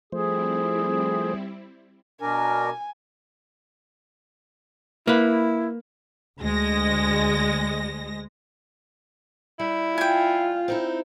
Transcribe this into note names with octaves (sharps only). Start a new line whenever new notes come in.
F3 G3 A3 C4 E4 G#4 C5
B2 D4 A#4 G#5
A#3 E4 B4
D2 G#3 A#6
G3 E4
F4 G5 G#5
C4 D#4 E4